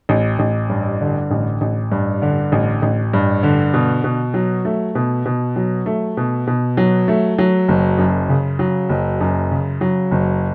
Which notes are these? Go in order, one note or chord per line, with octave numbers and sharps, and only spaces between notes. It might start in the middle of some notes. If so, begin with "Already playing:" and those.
A1
A1
G2
D3
A1
A1
G2
D3
A1
A1
G2
D3
B2
B2
F#3
A3
B2
B2
F#3
A3
B2
B2
F#3
A3
F#3
F#1
F#2
C#3
F#3
F#1
F#2
C#3
F#3
F#1